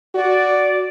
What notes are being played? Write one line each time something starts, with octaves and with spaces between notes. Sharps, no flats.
F#4 D5